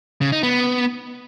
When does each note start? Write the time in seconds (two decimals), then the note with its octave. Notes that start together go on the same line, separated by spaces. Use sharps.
0.21 C#3
0.32 D#4
0.43 B3